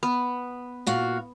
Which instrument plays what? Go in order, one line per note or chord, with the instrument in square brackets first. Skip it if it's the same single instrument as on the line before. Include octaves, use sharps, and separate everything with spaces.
[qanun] B3
[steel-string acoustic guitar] A#2 F#4 F5